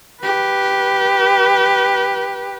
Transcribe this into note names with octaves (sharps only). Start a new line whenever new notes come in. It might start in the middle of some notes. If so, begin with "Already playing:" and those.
G4 B4